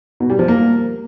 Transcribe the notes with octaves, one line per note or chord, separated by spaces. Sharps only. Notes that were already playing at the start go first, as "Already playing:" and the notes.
B2
G3
F3
A#3